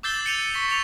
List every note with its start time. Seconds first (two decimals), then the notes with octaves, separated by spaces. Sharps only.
0.03 D6 E6 G6 A6 C7 G7
0.26 C#7 D#7 F7
0.54 C#6 B6
0.68 A6 C#7 F7